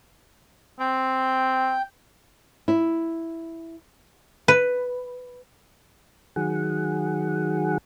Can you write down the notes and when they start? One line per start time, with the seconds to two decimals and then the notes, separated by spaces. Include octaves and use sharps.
0.80 C4 G5
2.68 E4
4.48 B4
6.36 D#3 F#3 G#4 F#5